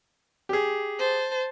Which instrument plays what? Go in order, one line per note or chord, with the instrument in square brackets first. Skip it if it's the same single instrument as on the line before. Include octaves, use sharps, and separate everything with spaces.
[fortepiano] G4 G#4
[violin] C5 A5